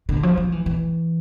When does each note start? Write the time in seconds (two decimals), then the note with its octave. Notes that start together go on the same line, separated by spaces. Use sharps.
0.09 D3
0.23 F3
0.37 F3
0.52 E3
0.66 E3